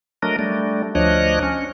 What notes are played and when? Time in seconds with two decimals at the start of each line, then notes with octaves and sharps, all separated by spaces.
0.23 F#3 A3 D4 A#4 D#5
0.39 G3 A3 D4
0.95 D2 F3 D4 C#5 D#5 F#6
1.43 C#4